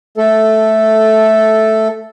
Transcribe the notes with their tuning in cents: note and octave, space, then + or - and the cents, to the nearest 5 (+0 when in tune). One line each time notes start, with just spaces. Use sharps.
A3 -5 A4 +0